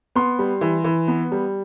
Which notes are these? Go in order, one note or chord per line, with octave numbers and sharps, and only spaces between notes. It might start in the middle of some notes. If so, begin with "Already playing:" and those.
B3 C6
G3
E3
E3
B3
G3